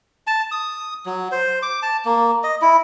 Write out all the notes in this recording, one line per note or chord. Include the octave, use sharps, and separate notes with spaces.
A5
D#6
F#3
C5
D6
A5
A#3
D#5
E4